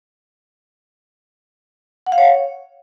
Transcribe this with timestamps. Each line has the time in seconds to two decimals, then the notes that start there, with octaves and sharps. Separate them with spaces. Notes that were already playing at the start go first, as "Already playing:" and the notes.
2.06 F#5
2.12 F5
2.18 C#5